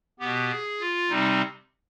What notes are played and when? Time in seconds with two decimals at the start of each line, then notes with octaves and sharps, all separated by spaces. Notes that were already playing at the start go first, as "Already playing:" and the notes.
0.20 B2 B3 G4
0.51 G#4
0.80 F4
1.10 C3 G3 C4 D#4